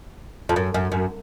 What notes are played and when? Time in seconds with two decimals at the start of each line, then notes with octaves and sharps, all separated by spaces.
0.49 F2
0.56 F#2
0.74 F#2
0.92 F#2